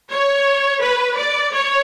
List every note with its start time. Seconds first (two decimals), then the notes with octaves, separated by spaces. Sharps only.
0.10 C#5
0.81 B4
1.16 D5
1.52 C#5